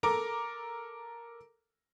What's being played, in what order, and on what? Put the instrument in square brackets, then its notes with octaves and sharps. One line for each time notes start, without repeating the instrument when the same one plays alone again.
[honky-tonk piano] A4 A#4 A#5 D6